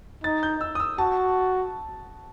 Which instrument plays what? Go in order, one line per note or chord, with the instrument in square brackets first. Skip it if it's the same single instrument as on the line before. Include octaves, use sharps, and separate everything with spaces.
[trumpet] D#4 [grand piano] A6
[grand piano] G6
E6
D#6
E6
[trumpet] F#4 [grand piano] A5